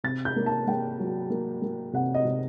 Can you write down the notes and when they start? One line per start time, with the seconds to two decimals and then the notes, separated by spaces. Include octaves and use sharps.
0.04 C3 A6
0.25 G6
0.36 A#3
0.46 A5
0.67 A#3 G5
1.00 F#3
1.30 A#3
1.62 A#3
1.93 C3 F#5
2.14 D#5
2.25 C3